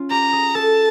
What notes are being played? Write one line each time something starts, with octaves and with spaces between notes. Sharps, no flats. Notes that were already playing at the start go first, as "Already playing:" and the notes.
Already playing: C#4 F4
G4 A#5
G#4
A4 A5